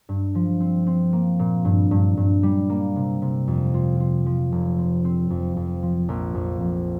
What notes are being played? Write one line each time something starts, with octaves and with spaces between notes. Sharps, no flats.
G2
F3
C4
C4
A#3
A#2
G2
G2
G2
G3
A#3
C3
C3
F2
F4
F4
F3
F1
C4
C4
F2
F2
F3
A#1
F2
F2